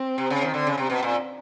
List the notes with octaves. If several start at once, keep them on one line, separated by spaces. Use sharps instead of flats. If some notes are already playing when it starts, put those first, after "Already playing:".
Already playing: C4
C3
C#3
D#3
D3
C#3
C3 C4
B2
A#2